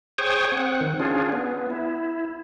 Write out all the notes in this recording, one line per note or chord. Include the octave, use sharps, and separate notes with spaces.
G#4 C5 C#5 G5 C#6 D#6
C4 F#5
D#3
C#4 D4 F4 G#4
B3
E4